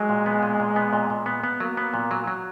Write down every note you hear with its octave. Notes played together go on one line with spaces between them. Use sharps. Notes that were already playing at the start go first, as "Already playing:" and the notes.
Already playing: F#3 G#3
A#2
B3
A#2
A#2
B3
A#2
A#2
B3
B3
F#3 A#3
B3
A#2
F#3
F#3